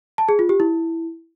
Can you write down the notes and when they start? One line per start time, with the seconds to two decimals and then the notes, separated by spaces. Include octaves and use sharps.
0.18 A5
0.29 G#4
0.39 F4
0.49 G4
0.60 E4